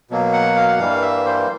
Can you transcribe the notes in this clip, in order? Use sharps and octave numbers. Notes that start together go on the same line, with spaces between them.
B2 F#3 A#3
F#5
F5
F#5
G2 E3 G3 A#3 F5
E5
C5